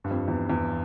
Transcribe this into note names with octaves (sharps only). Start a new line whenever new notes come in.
G2
F2
E2
E2